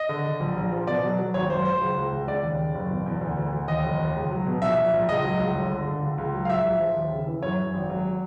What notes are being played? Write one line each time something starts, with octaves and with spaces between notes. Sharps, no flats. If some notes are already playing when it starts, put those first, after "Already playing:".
Already playing: D#5
D3
D3
A#1
A#1
F3
B2 D5
F#3
F#3
G#1 C#5
F#2 C5
F#3 C5
C#2
C#2
C#2
C#3 D5
D#2
D#2
F#1
B2
E2
D2
D2
D2
D#2 D#5
F1
D#2
C#2
F#3
B2
A#1 E5
A#1
A#1
C#2 D#5
F#3
C#2
G1
D3
D3
C#2
C#2
F#3
F5
A#1 E5
A#1
F3
D#2
C#3
E3
F#2 C#5
F#2
G#1
F#3